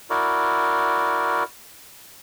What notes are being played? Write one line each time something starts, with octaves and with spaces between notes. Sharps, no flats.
E4 F#4 A#4 D5